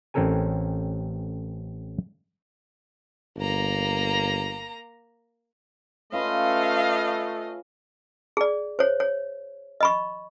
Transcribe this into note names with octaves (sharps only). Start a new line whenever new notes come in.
A1 C4 C#4 A4 A#4 G#5
G1 A#3 A#5
A3 C#4 F4 B4 D#5 F5
G#4 D5
C5 C#5
C#5
D#5 B5 C#6